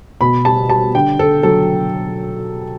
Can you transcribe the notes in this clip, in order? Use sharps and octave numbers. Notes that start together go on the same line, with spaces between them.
B2 B5
G3 A5
G3 A5
D3 G5
D3 A4
F#3 A4